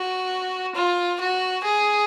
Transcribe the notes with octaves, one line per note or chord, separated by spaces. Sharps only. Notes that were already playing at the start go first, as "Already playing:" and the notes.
Already playing: F#4
F4
F#4
G#4